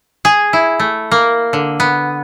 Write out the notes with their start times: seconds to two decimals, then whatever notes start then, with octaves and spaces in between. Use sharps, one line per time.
0.25 G#4
0.53 E4
0.80 A3
1.11 A#3
1.53 D3
1.80 B3